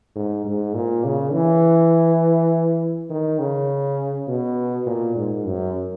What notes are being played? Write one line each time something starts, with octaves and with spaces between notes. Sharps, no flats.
G#2
G#2
A#2
C#3
E3
D#3
C#3
B2
A#2
G#2
F#2